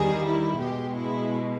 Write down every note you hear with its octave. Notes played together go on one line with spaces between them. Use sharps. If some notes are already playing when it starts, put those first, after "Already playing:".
Already playing: E2 D#3 G3 G#4
E4
B2 G#3 G4
E4